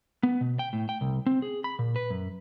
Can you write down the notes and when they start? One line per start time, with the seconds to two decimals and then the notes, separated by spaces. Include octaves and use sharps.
0.23 B3
0.41 B2
0.59 G5
0.73 A2
0.89 G5
1.01 C2
1.26 C4
1.42 G#4
1.64 B5
1.79 A#2
1.96 B4
2.10 F#2